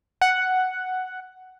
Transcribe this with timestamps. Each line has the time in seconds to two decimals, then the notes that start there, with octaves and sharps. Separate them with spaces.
0.22 F#5